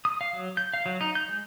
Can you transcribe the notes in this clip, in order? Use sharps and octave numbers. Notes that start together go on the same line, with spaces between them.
D#6
F5
F#3
G6
F5
F#3
D#4
G6
G#3